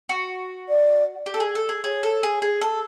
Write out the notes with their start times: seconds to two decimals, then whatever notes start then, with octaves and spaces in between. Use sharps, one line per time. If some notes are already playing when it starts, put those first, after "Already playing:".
0.09 F#4
0.68 D5
1.26 G4
1.34 A4
1.40 G#4
1.55 A4
1.69 G#4
1.84 G#4 C#5
2.03 A4
2.23 G#4
2.42 G#4
2.61 A4